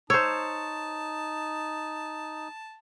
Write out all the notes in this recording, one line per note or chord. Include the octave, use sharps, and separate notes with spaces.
D#4 C5 C#5 A5 E6